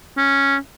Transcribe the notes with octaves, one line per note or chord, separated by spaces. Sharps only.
C#4